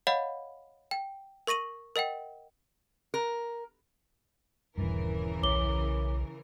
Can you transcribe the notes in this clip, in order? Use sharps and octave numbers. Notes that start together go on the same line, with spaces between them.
C#5 D#5 F5 F#5 B5
G5
A#4 C#6 A#6 D#7 F#7
A#4 D#5 F#5 G5
A#4
D#1 G2 C#3 E3 A#4
B1 C#5 D6 G7